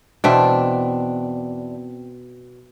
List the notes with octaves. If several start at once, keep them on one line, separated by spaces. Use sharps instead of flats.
E2 B2 C4 D4 E5